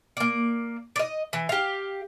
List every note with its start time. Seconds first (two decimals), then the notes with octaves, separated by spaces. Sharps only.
0.17 A#3 D5
0.96 D5 D#5
1.33 E3
1.49 G4 F5